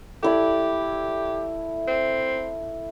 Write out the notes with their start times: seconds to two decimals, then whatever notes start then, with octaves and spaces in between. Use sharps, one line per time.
0.23 A3 E4 G4 D5
1.87 C4